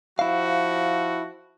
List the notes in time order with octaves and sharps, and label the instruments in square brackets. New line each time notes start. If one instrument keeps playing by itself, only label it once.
[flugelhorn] F3 [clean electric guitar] E4 F5 [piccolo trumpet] F#4